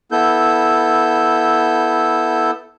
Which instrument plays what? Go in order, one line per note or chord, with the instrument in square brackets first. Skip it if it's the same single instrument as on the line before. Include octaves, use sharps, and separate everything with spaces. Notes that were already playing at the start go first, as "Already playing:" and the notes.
[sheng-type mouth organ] B3 E4 A4 G6